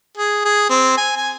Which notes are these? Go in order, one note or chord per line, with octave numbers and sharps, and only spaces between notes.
G#4
G#4
C4
G#5
G#5